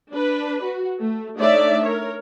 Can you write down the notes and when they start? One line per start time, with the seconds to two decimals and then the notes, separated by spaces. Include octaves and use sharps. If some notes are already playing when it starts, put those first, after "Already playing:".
0.11 D4 B4
0.63 F#4
0.99 A3
1.38 A3 D4 D#4 C#5 D5 E5
1.83 A#4 C#5